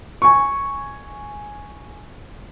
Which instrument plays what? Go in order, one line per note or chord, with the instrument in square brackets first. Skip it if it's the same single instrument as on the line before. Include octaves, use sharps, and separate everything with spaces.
[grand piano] G#5 C#6